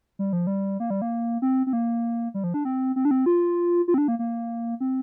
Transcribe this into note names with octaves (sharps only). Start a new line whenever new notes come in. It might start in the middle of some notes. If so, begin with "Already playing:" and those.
G3
F3
G3
A#3
G3
A#3
C4
C4
A#3
G3
F3
D4
C4
C4
D4
C4
F4
F4
C4
D4
A#3
A#3
C4